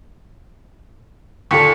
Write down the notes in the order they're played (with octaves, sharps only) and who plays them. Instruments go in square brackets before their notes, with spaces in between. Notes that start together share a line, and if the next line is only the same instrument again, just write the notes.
[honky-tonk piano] D#2 A#2 A4 [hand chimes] C#6 B6 C#7